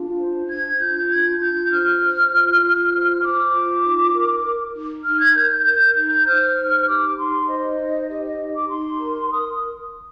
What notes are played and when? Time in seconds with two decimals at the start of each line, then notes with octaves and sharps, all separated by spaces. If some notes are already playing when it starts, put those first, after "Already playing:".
Already playing: D4 F4
0.18 C5
0.48 D4 G#6
0.79 F4 G6
0.95 G6
1.09 D4 G#6
1.39 F4 G6
1.70 C5 F6
2.00 C5
2.31 F4
2.62 F4
2.92 C5
3.22 C5 D6
3.53 F4
3.83 D#4
4.13 A#4
4.44 A#4
4.74 D#4
5.04 D#4 F6
5.20 G#6
5.35 A#4 G6
5.50 G6
5.65 A#4 G6
5.95 D#4 G6
6.26 C5 F6
6.56 D#4
6.87 G4 D6
7.17 D#4 C6
7.47 C5 D#5
7.78 D#4
8.08 G4 D#5
8.23 D#5
8.38 D#4
8.53 D6
8.69 D#4 C6
8.99 A#4
9.30 A#4 D#6